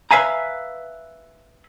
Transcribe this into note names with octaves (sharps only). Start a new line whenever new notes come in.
B4 E5 F5 G#5 A#5